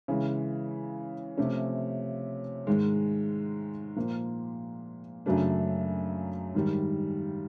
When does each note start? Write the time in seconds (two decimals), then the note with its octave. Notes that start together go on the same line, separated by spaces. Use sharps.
0.08 C#3 E3 G#3
1.38 C3 F3 A3 C#4
2.67 G#2 D#3 G#3
3.96 A#2 F3 A#3
5.26 F#2 C#3 F#3 A3 D4
6.54 G#2 D#3 G3